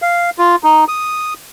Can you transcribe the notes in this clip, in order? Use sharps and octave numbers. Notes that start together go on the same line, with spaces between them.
F5
F4
D#4
D#6